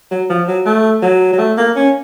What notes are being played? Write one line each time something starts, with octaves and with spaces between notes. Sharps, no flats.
F#3
F3
F#3
A3
F#3
F#3
A3
A#3
C#4